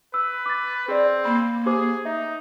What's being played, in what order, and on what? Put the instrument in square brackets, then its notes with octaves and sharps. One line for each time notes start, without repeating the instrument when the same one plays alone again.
[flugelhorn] B4 [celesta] E6
[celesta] D6 A6
[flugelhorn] C4 [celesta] G#4 D5
[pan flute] A#3 [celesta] B5
[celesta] G4 C5 D6 [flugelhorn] G#4
[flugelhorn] D#4 [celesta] E5